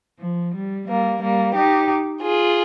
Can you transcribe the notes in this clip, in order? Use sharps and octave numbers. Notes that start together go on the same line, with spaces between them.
F3
G3
G3 A#3
G3 A#3
D#4 G4
F4 G#4